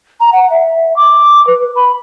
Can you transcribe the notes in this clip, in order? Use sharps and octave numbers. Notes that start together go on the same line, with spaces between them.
A#5
F#5
E5
D6
B4
B5